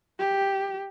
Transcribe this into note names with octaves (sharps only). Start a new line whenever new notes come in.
G4